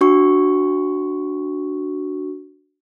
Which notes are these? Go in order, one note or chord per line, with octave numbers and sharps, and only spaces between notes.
D4 F#4 C#6